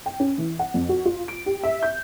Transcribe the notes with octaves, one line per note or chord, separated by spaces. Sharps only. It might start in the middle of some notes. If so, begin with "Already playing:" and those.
G5
C#4
E3
F#5
F2
F#4
F4
D7
G4
E5
G6